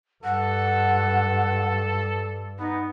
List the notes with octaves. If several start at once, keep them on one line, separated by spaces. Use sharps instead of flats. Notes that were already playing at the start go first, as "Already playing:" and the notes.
G2 A4 F#5
B3 D#4